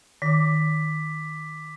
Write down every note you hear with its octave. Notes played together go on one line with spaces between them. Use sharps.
D#3 D6 B6